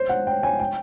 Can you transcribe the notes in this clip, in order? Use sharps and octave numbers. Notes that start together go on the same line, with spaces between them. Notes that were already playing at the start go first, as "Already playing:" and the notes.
Already playing: C5
F#5
G5
G#5
G5